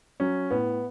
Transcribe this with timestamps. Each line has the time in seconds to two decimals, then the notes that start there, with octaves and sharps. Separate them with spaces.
0.20 F#3 C#4
0.51 A2 B3